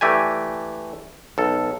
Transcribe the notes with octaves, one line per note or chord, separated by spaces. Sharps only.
E3 A3 G4 D5 G#5
B1 A4